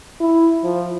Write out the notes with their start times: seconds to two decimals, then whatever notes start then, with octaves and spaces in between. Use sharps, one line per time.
0.20 E4
0.64 F3